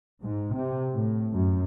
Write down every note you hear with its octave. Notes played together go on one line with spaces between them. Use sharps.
G#2
C3
A2
F#2